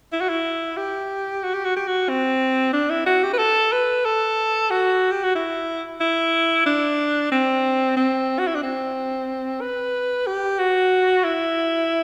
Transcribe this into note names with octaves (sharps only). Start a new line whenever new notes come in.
E4
F#4
E4
G4
F#4
G4
F#4
G4
F#4
C4
D4
E4
F#4
G4
B4
A4
B4
A4
F#4
G4
F#4
E4
E4
D4
C4
C4
F#4
E4
D4
C4
B4
G4
F#4
E4